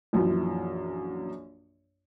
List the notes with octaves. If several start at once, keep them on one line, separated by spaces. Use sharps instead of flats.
A#1 F#2 E3 F3